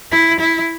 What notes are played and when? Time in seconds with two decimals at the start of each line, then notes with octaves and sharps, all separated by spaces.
0.12 E4
0.40 E4